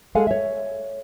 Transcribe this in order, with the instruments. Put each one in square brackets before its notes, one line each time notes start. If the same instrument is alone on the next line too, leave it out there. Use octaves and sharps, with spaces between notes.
[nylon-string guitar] G#3 G#4 A4 F5 F#5 G#5
C#5 E5